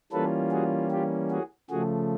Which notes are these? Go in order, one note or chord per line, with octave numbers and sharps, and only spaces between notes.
E3 G3 A#3 C#4 F4 A4 B4
F#4 G#4
F4 G4
F#4 G#4
C#3 F3 A3 F#4 G#4